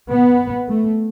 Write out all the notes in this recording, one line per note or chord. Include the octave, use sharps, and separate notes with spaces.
B3
A3